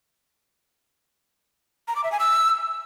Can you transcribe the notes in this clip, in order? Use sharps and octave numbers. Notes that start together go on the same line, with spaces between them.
A#5
D6
E5
G#5
E6